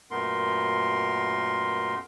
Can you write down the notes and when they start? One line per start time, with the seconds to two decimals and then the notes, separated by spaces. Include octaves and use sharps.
0.11 F#2 A#2 A3 B3 A#4 C6